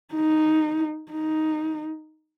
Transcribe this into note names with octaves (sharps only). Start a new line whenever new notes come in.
D#4
D#4